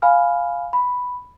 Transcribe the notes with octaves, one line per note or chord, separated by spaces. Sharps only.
F5 G#5 B5 F6
B5